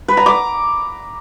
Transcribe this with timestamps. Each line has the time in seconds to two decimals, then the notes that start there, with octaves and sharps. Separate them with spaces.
0.08 B4
0.17 A#5
0.26 D6